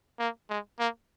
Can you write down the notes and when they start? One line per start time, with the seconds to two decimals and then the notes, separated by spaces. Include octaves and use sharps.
0.19 A#3
0.49 G#3
0.79 A#3